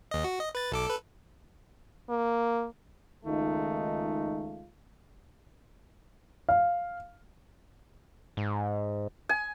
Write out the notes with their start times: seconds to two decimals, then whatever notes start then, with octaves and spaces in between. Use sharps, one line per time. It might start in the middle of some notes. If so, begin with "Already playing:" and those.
0.11 D#2 D#5
0.24 F#4
0.40 D#5
0.55 B4 A6
0.72 B1 A4 D6
0.87 A4 B4
2.09 A#3
3.26 C#2 D#3 G#3 A3 D#4 F4
6.49 F5
8.37 G#2
9.29 G#5